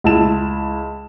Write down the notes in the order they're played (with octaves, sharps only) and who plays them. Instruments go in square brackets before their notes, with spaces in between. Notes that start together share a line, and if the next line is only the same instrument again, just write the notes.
[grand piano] C#2 E4 A5 E7